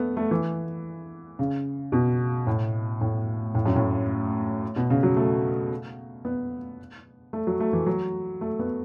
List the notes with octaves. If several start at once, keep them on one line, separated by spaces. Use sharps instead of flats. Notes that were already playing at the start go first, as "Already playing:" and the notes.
Already playing: A3 B3
A3
E3
C#3
B2
A2
A2
A2
F#2
A2
B2
C#3
F#3
A3
B3
A3
F#3
A3
E3
F#3
A3
B3